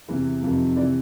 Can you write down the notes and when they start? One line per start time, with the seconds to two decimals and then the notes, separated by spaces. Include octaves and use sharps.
0.08 E2 C3 E3
0.42 F2 C3 D#3
0.76 C3 E3 D5